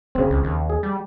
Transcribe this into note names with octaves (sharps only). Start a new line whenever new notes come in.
F#1 C#3 C4
C#2
D#2
G#4
G3